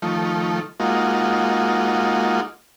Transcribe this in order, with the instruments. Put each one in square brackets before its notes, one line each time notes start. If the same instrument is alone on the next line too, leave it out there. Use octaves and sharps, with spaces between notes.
[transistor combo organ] D#3 F3 A3
G#3 A#3 D#4 F4 F#4